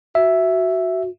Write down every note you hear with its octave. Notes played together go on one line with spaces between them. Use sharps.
F#4 E5